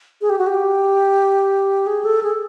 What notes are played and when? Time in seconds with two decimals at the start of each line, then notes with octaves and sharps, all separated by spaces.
0.21 G#4
0.29 G4
0.38 F#4
0.47 G4
1.86 G#4
2.05 A4
2.23 G#4